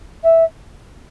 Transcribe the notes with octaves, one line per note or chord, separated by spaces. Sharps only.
E5